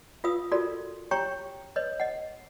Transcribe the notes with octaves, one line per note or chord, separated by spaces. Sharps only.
F4 B4 F5 D#6 E6
F4 F#4 A4 A#4 D5
G4 C#5 G5 A#5 C#6
B4 C#5 D#5
D#5 F#5